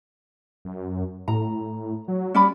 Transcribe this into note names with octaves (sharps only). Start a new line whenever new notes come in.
F#2
A2 A#5
F#3
G3 C#4 D5 B5